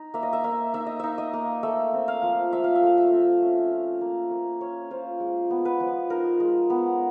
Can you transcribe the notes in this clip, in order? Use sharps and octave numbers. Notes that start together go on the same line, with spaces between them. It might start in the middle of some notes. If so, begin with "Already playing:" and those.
Already playing: D#4
A#3 E5
D#5
E5
A#3 E5
D#4 E5
D#5
D#4 E5
D#5
A#3
A3 E5
C4
F5
F3
F3 E5
F5
E5
A3 F5
E5
C4
C#4
F4
A#3
A#3
C#4 C#5
F4 C5
G#3
B3
B4
F3
D#4 A#4
G#3
B3